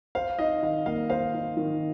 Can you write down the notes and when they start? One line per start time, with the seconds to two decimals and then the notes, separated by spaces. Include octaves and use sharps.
0.15 C5 F5
0.39 D#4 D#5
0.62 D#3 F5
0.86 A#3 F5
1.10 C5 F5
1.34 D#4
1.57 D#3